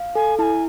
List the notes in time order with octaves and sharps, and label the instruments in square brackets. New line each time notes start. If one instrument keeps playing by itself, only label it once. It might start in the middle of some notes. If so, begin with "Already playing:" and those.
Already playing: [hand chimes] F5
[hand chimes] A4 [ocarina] G#5
[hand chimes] E4 [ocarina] A5
[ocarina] G#5